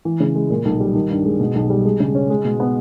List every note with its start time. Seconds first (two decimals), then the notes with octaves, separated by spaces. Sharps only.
0.05 E3
0.20 C#3
0.35 G#3
0.50 A#2
0.65 B1
0.80 G3
0.95 D#3
1.10 G2
1.25 G#3
1.40 B2
1.55 B1
1.70 G3
1.85 G#3
2.00 C#3
2.15 C#4
2.30 G#3
2.45 B2
2.60 B3